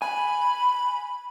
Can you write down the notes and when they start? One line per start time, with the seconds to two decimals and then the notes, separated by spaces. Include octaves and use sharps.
0.02 G#5 B5